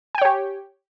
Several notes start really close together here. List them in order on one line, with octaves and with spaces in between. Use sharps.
G#5 G5 C#5 G4